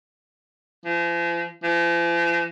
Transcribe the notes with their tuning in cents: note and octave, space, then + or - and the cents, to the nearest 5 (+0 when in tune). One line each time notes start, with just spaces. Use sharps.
F3 -40
F3 -45